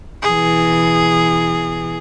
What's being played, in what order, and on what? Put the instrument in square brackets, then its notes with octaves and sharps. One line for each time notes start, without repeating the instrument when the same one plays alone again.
[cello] B2 E3 [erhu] G#4